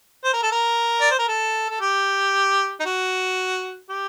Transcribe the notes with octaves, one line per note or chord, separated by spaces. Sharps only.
C5
A#4
A4
A#4
D5
C5
A#4
A4
A4
G4
D#4
F#4
G4